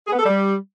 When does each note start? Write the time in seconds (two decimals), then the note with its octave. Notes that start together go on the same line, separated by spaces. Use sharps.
0.06 G#4
0.13 B3
0.19 A4
0.25 G3